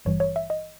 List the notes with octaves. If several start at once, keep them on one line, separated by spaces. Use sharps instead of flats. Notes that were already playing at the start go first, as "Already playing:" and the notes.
G#1 G2 E3 G3 C#5
C#5
E5
D#5